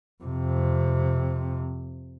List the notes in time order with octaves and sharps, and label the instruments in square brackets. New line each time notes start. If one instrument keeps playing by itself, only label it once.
[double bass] F2 C3